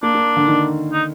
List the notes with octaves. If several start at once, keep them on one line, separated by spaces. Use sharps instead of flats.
A#3 D4
A#3
D3
D#3
D#4